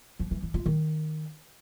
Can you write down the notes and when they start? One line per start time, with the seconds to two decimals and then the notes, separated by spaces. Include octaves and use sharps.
0.19 F3
0.31 E3
0.43 E3
0.54 F4
0.66 D#3